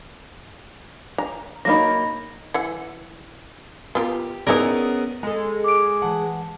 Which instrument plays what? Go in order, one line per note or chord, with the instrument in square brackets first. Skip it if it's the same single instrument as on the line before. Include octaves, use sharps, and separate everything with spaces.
[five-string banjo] A#5
[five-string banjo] F#3 A#3 D#4 [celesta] B5 A#6
[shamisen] E3 F#5
[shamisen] B3 F4 A#4 [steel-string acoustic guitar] G4
[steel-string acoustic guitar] B3 C#4 G#4 [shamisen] D#4 E4 D5 [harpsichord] A#4
[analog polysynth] G#3 [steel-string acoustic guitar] A4 A#5
[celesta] D6 D7
[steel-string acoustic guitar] E3 F#5 [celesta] A5